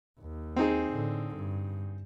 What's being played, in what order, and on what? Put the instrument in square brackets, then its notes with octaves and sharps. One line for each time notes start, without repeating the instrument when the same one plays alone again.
[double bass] D#2
[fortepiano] C4 D#4 G#4
[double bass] A2 D3
G2